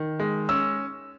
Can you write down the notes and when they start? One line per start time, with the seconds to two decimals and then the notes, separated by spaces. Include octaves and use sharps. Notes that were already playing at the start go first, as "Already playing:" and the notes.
Already playing: D#3
0.19 G#3
0.49 C#4 E6